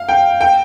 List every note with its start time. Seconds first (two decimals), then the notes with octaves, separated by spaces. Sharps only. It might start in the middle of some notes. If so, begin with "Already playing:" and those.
Already playing: F5
0.09 G5
0.41 G5